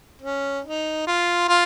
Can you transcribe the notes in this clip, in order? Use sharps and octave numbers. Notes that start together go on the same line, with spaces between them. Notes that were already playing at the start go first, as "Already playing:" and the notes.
C#4
D#4
F4
F4